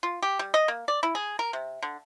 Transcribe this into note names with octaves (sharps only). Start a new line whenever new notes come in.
F4
G4
G3
D#5
A#3
D5
E4
G#4
A#4
C3
D3